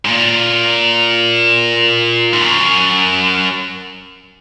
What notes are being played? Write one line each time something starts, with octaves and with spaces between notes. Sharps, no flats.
G#2
A#2
G#2
F#2